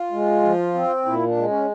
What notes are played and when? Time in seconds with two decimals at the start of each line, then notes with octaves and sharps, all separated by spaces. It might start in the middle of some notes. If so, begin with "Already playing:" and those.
Already playing: F4
0.12 G#3
0.43 F3
0.74 C4
1.05 A#2 E4
1.27 D4
1.37 G#3
1.47 C#4